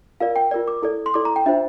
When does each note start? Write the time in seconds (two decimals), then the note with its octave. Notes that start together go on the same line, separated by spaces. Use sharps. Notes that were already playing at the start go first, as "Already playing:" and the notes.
0.20 F4 A#4 D5 F5
0.36 G5
0.51 F4 A#4 D5
0.68 D6
0.82 E4 A4 D5
1.06 C6
1.14 E4 A4 D5 D6
1.25 A#5
1.36 G5
1.46 D4 F4 C5 E5